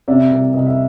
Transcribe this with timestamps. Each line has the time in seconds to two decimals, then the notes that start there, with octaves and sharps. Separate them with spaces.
0.08 C3 D5 E5
0.31 C2
0.54 C2 D#5
0.66 E5